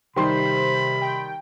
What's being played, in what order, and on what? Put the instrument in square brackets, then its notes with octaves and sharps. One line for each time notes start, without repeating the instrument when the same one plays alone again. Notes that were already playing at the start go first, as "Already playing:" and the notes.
[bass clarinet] C3 [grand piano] D#3 G3 C6 [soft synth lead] C5 [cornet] B5
[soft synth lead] G5